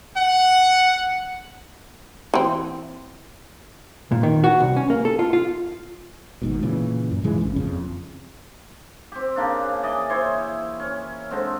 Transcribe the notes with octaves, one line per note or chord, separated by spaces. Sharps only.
F#5
E3 C4
A#2
D#3
F#4
C2
C#4
A#3
A4
F4
F4
G#1 G#2 B2
A#2 C#3 E3
F#2
G#2 C#3 E3 G#3
A1 C#4
F#1 F2 C#3
C4 G4
C#3 A#3 D4
E3 D5 D#5
E4 C5 C#5
C#4
D3 G#3 C4